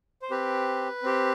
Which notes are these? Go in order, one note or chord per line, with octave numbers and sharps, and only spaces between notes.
C5
C4 G4 B4
C4 G4